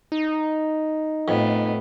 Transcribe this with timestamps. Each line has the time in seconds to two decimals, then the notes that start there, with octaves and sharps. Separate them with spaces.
0.12 D#4
1.28 F2 A2 B3